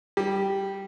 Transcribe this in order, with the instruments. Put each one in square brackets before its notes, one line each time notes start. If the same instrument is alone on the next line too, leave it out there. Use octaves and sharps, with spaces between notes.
[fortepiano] G3